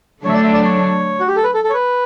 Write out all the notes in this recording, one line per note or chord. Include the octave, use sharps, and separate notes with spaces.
D3 F#3 A3 D4 C#5 E5
D5
E5
D5
C#5
F#4
G4
A4
B4
A4
A4
C#5
B4